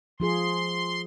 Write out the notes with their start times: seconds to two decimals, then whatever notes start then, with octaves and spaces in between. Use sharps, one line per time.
0.20 F3 F4 G#4 C6